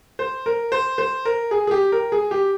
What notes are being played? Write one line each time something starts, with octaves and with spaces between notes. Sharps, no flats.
C5
A#4
C5
C5
A#4
G#4
G#4
G4
A#4
G#4
G4